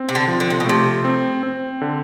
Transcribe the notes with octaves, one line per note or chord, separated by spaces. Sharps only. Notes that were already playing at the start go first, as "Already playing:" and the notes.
Already playing: C4
C3
D3
F3
D3
C3
B2
C3 A3
C4
C4
D3